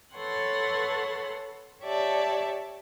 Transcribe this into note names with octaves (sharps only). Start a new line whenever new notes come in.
A4 B4 C#5 F#5 C6
G4 C#5 D5 E5 A5